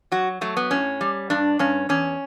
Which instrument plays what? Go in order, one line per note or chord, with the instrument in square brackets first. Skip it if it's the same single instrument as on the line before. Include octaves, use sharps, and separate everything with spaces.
[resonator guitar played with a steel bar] F#3 F#4
F#3 A3
B3
A2 C#4
G3
G2 D4
G2 C#4
E2 C#4